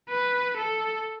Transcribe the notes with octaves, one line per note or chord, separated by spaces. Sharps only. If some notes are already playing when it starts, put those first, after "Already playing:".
B4
A4